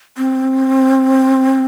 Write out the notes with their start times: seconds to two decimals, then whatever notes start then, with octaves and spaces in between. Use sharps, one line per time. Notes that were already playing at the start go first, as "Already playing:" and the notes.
0.17 C4